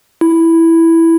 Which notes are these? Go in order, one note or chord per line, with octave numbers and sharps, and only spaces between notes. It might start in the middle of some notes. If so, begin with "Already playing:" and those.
E4